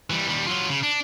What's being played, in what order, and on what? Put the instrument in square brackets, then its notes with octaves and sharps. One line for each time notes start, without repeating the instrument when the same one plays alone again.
[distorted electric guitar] E3 G3
D#2 G3
F#3 F4
C#3
D4